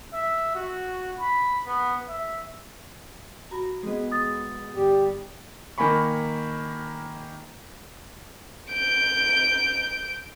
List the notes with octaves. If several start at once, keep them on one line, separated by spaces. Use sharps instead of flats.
E5
F#4
B5
B3
E5
F#4 A#5 B5
G#3 B3 G#4 D#5
D#6 A6
G1 G3 G4
D#3 A#3 G#5 B5 C#6
G6 D7